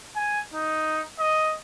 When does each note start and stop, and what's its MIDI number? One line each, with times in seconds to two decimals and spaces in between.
0.16 0.40 80
0.54 1.01 63
1.20 1.55 75